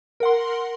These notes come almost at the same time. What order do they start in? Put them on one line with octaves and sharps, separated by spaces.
A#4 F#5 C6